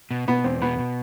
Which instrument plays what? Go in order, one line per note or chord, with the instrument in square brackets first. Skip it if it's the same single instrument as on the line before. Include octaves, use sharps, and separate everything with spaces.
[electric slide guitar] B2
[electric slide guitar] B2 [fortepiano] B3
[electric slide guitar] E2 [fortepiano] C4
[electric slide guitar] B2 [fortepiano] B3
[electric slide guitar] B2